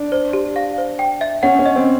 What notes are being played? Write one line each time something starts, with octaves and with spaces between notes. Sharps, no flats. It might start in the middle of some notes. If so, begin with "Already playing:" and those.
Already playing: D4
C5
G4
F5
C5
G5
E5
C#4 F#5
C#4
D#5
C4